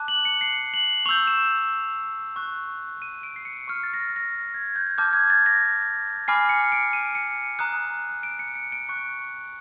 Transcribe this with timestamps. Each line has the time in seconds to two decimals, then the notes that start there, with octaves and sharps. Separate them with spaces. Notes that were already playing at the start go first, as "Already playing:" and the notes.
Already playing: A5 D6 F#6
0.08 F#7
0.25 C#7
0.41 C7
0.74 F#7
1.06 C#6 E6 G6 F7
1.27 E7
2.36 C#6 F#6
3.02 D#7
3.23 D7
3.36 C7
3.45 C#7
3.68 C#6 F6
3.83 A6
3.94 A#6
3.99 A6
4.16 A#6
4.54 G#6
4.76 G6
4.98 A5 D6 F6 G6
5.13 G#6
5.30 A6
5.46 A#6
6.28 G#5 B5 D6 F6 C7
6.49 C#7
6.72 D7
6.93 D#7
7.15 C#7
7.59 A#5 D#6 F#6
8.23 D7
8.39 C#7
8.56 C#7
8.72 D7
8.89 C#6 F#6 C#7